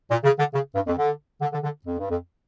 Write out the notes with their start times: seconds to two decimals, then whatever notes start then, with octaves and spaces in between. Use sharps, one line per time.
0.10 A#2
0.24 C#3
0.39 D3
0.54 C#3
0.75 G2
0.87 F2
0.97 D3
1.41 D3
1.53 D3
1.64 D3
1.85 F2
1.99 G2
2.10 F2